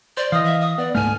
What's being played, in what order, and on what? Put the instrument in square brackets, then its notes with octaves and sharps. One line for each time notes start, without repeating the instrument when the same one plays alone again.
[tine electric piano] C5 [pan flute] D5
[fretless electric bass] E3 [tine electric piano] D#5 F5 [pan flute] D#6
[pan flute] E5
D#6
[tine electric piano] B3 [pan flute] D5
[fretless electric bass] D1 G#2 A3 [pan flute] G#5 [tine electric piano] F6